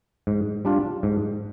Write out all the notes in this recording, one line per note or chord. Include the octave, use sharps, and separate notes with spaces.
G#2
G3 D4 F4
G#2